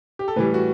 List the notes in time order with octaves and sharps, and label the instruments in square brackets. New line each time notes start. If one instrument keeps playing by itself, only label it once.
[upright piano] G4
A4
A2 E3 G3 B4
F#4